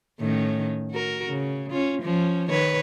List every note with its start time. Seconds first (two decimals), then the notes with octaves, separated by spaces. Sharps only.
0.19 A2 D#3 C#4
0.91 F#4 A#4
1.28 C#3
1.70 C#4 F4
2.02 F3 C#4
2.50 D#3 B4 C#5